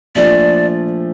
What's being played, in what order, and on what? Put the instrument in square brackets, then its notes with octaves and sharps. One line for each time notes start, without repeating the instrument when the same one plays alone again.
[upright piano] A#2 F3 A3 D4 [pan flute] D5